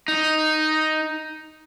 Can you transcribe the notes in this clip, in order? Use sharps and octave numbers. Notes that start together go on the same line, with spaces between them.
D#4